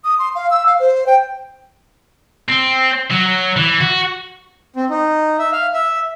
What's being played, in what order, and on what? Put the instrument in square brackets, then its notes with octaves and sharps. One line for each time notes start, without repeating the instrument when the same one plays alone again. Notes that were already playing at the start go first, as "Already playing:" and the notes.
[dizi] D#6
C6
F5
E6
F5
C5
G5
[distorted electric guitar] C4
F#3
E3
F#4
[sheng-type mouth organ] C4
D#4
E5
F5
E5